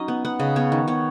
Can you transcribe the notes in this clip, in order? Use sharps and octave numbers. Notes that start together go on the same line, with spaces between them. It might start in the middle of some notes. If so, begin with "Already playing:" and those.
Already playing: F#3 C#4 D#4 D#5
B3
B3 F#5
C#3 D#5
B3 C#5
D#3
B3 C#5